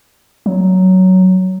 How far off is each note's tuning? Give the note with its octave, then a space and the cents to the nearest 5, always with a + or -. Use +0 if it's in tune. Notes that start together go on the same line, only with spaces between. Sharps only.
F#3 +10